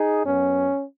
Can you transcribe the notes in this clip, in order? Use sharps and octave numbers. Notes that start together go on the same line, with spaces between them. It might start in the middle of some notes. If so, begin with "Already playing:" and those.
Already playing: D#4 G#4
F#2 F#3 B3 C#4